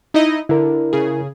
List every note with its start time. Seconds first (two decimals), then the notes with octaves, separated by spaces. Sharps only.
0.14 D#4 E4 D#5
0.49 D3 E4 A#4
0.93 C#3 G#4